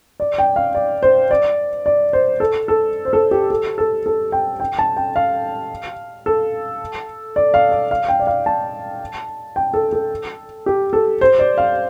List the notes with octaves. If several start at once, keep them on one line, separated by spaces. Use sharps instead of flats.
D5
G5
F5
D5
C5
D5
D5
C5
A4
A4
C5
A4
G4
A4
A4
A4
G5
G5
A5
G5
F5
A4
D5
F5
D5
F5
G5
D5
F5
A5
G5
A4
A4
G4
A4
C5
D5
F5